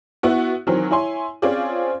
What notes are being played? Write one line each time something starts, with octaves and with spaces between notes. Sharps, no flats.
B3 E4 F#4
D#3 E3 F#3 C4
E4 C#5 G#5 C6
C4 C#4 F4 G#4 C5 D5